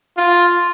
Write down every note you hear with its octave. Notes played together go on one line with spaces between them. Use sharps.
F4